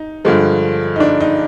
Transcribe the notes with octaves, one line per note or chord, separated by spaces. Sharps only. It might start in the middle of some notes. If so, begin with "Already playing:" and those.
Already playing: D#4
G2 D3 F3 G#3
D#4
D4
D#4